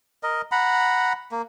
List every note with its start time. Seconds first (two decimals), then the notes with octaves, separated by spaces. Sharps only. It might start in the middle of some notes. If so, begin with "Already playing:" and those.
0.23 A#4 D#5
0.52 F#5 A#5 B5
1.32 A#3